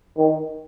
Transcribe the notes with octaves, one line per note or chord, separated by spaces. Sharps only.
D#3